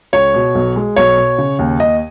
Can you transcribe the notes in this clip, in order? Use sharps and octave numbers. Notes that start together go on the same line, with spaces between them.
C#2 C#5
B2
B1
G#3
B1 C#5
B2
C#3
D#2
D#2 D#5